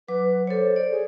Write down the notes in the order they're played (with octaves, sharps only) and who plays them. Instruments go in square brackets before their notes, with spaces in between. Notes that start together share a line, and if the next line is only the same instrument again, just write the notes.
[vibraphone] F#3 D6 [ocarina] B4
[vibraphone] A4 C#5 [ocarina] C5
[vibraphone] D5
[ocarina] G#4